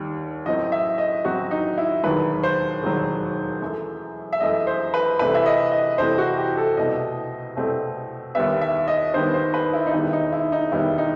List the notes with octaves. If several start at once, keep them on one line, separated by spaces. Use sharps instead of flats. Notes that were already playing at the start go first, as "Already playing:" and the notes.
Already playing: D#2 D#3 G3
A1 A2 F#3 C4 D#5
E5
D#5
A1 A2 F#3 C4 F#4
D#4
E4
E1 D#2 D#3 F#3 B4
C5
E1 D#2 D#3 F#3
F#2 E3 A3
E5
F#2 E3 A3 D#5
C5
B4
C2 C3 E3 A3 C4 B4
E5
D#5
D#5
C2 C3 E3 A3 C4 C5
F#4
G4
A4
C2 B2 A3 C4 D#5
C2 B2 A3 C4
D#2 D#3 G3 B3 E5
E5
D#5
D#2 D#3 G3 B3 C5
C5
B4
E4
D#4
E1 D#2 D#3 G3 B3 E4
D#4
E4
D#4
E1 D#2 D#3 G3 B3 E4
D#4